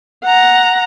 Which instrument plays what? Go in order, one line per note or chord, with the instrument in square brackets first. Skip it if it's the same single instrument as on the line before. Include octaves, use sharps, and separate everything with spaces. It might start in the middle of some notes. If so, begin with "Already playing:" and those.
[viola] F#5 A#5